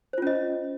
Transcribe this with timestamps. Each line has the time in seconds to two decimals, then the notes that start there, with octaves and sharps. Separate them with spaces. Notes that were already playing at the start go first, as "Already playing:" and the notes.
0.13 C5
0.18 F4
0.22 C#4
0.27 D#5